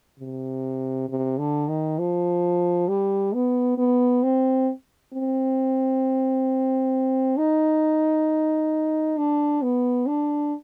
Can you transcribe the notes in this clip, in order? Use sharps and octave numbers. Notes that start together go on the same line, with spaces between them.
C3
C3
D3
D#3
F3
G3
B3
B3
C4
C4
D#4
D4
B3
D4